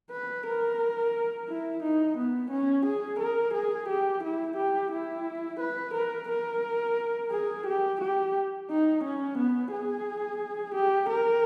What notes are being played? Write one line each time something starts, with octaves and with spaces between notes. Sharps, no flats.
B4
A#4
E4
D#4
B3
C#4
G#4
A#4
G#4
G4
E4
G4
E4
B4
A#4
A#4
G#4
G4
G4
D#4
C#4
B3
G#4
G4
A#4